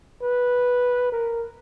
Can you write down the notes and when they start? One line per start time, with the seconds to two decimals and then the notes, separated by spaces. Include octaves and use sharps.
0.22 B4
1.12 A#4